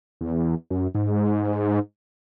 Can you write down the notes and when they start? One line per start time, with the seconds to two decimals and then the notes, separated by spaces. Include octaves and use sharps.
0.21 E2
0.70 F#2
0.94 G#2